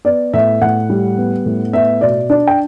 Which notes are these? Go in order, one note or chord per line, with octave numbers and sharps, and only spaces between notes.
B3 D5
A2 E5
A2 F#5
G3
B3
A2
B3 E5
B2 D5
D4 D5
G5